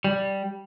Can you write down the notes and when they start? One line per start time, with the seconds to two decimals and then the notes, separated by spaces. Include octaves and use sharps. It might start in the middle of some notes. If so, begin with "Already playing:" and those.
0.04 G3